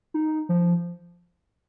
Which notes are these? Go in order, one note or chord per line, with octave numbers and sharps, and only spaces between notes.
D#4
F3